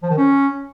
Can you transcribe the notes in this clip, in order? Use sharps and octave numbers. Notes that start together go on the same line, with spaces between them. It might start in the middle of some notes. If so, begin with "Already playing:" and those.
F3
D#3
C#4